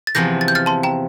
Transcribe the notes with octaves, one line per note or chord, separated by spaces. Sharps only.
A6
E2 C3 F3 C4 G6 A#6
A6
G6
F6 A6
A5 C6
G5 A#5